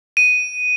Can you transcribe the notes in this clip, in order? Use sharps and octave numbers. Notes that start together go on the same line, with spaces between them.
D#7